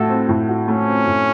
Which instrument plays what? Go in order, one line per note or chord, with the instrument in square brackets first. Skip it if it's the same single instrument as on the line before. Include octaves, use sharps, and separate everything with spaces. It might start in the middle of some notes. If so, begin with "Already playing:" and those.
Already playing: [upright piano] A2 A3 F#4 [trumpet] A4
[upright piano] C4
A2
F#4
[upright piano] A3 [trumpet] C#4
[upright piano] C4
A2